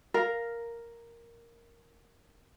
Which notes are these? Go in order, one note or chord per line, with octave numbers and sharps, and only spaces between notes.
A#4 F5